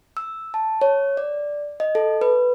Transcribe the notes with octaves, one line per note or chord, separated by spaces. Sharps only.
E6
A5
C#5
D5
D#5
A4
B4